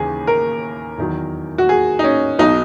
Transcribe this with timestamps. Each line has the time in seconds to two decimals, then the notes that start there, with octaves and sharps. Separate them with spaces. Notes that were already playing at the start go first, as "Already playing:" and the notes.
Already playing: D#2 C#3 E3 G#4
0.27 A#4
0.98 E2 D#3 F#3
1.58 F#4
1.69 G#4
1.99 D#4
2.04 C#4
2.39 B1 B2 F#3 D#4